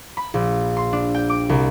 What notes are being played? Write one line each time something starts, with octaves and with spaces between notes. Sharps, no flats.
B5
A#1
C6
D4
G5
D6
C2